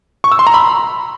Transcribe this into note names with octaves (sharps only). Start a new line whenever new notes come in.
C#6
E6
C6
A#5
B5